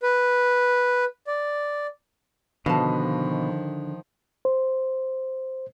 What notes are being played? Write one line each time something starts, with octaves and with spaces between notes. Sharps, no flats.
B4
D5
B2 D3 D#3 F3 F5 A5
C5